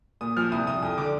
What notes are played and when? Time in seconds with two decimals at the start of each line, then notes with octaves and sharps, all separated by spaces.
0.21 A#2 D#6
0.37 F3 F6
0.52 C2 D#6
0.67 C2 D#6
0.82 F2 D#6
0.98 D3 D6